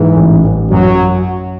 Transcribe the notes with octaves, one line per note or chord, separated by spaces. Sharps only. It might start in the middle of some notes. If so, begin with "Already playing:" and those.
Already playing: G#2 E3
A1
A1
F#2 F#3